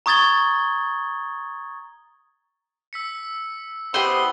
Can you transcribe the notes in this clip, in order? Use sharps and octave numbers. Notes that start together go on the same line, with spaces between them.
A#5 C#6 D#6 G#6 A6 G7
E6 B6 C#7
B3 E4 G4 C5 D#5 E6 F#7 G7